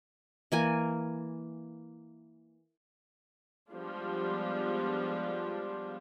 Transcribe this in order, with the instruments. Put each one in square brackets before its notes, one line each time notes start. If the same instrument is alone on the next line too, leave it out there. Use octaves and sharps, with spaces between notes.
[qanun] E3 A#3 G#5
[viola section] F3 G3 G#3 B3 D4 F4